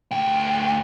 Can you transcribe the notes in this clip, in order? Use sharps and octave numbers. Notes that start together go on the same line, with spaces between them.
D2 G5